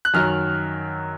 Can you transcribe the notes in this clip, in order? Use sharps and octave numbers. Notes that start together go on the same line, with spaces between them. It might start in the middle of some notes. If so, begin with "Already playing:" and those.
F#6
F#2 D#3 F#3 F6